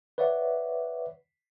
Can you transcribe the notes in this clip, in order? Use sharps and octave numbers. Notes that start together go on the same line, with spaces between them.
B4 C#5 D5 E5 F#5